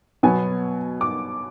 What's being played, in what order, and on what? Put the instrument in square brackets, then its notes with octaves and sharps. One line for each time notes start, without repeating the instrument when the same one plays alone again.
[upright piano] B2 F#3 B3 G#5
D6